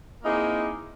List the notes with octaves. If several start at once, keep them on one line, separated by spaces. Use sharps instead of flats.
A#3 C4 D#4 E4 G#4